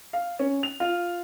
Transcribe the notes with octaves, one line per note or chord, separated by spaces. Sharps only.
F5
C#4
F7
F4